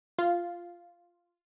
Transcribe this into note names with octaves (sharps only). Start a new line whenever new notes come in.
F4